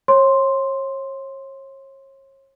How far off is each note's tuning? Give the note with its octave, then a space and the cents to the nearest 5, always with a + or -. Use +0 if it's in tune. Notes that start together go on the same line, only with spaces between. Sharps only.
C#5 -35 C6 +0